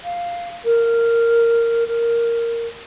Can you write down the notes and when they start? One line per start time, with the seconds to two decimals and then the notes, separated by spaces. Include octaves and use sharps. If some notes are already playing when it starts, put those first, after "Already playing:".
0.04 F5
0.65 A#4
1.87 A#4